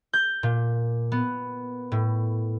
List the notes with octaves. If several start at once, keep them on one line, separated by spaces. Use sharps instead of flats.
G6
A#2
B3
A2